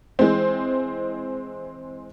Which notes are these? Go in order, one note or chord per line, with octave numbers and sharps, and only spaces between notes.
E3 G#3 C4